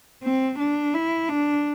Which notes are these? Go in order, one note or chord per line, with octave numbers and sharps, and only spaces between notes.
C4
D4
E4
D4